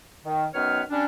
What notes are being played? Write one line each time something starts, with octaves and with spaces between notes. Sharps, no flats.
D#3
F#2 D#3 B3 B4 C#5 F6
G3 C#4 D4